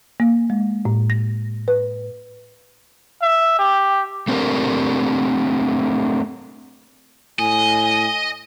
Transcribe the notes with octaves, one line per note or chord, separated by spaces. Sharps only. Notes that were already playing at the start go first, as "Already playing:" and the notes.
A#3
G#3
A2
A#6
B4
E5
G4
A3 C4 D4 G4 A#4
A2 D#5 G#5